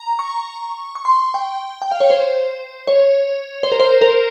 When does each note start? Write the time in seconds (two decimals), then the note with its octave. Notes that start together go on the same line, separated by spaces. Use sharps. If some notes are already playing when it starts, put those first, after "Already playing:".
Already playing: A#5
0.19 C#6
0.95 C#6
1.05 C6
1.34 G5
1.82 G5
1.91 F5
2.00 C#5
2.10 C5
2.87 C#5
3.63 C5
3.72 A#4
3.80 C5
4.01 A#4